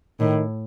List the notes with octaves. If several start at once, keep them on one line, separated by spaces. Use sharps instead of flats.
A2 D#3